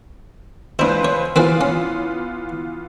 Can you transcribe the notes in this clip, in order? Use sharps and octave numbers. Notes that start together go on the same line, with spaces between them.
C#2 D4 E4 B4 C5
C#5
E3 B3 C4 F4 B4 G#5
C#4